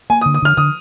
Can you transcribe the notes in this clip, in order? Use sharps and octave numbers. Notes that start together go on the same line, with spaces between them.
A#3 G#5
D#6
D3
D#6
D3 F6
D3 D#6